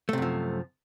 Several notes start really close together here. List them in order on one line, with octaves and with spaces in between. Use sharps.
A3 C3 F#2 F3